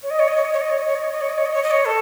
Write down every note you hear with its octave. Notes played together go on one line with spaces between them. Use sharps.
C#5
D#5
C#5
D#5
C#5
D#5
C#5
D#5
C#5
D#5
C#5
D#5
C#5
D#5
C#5
D#5
C#5
D#5
C#5
D#5
C#5
A4